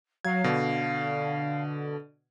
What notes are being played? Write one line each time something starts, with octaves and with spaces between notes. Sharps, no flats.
F#3 F5 G#6
B2 D3